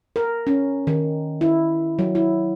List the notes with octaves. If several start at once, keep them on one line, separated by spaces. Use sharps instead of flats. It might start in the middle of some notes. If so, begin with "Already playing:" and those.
A#4
C#4
D#3
E4
F#3
E4